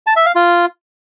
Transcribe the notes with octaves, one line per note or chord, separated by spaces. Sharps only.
A5
E5
F5
F4